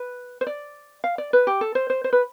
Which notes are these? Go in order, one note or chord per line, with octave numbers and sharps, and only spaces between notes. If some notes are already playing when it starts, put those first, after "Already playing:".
Already playing: B4
C5
D5
F5
D5
B4
G4
A4
C5
C5
C5
B4